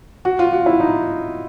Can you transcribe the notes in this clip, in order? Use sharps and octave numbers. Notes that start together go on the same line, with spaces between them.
F#4
F4
F#4
E4
D#4